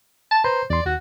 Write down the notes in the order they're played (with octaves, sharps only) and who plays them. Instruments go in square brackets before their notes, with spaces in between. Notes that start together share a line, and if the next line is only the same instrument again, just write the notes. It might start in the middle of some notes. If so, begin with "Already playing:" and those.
[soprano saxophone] A5
[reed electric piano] B4 A#5 C6 [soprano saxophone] C5
[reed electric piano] E2 C6 [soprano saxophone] D5
[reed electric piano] D#2 [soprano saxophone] F#4